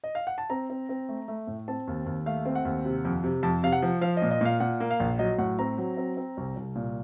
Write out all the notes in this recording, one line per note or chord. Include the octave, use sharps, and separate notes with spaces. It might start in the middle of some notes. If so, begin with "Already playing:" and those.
D#5
F5
F#5
A5
C4 A#5
C4
C4
A3
A3
A2
C4 A5
D#2
D#2
A3 F5
C4
F#5
D#2
C3
F2
C3
F2 A5
C3 F5
F#5
F3
F3 F5
D#5
A#2
D#5
A#2 F5
A#2 F#5
A#3
F5
A#1
F#3 D#5
A2 F#5
C4 A#5
F#3
C4
C4
C2
C2
A#2